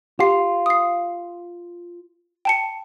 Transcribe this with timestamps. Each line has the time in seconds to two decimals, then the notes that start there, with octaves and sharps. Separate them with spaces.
0.19 F4 G4 C7
0.66 D#6 C7
2.45 G5 A5 C#7